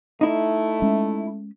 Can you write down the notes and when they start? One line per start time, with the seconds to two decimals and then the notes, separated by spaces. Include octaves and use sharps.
0.21 A3 D#4 E4
0.82 G#3 C#4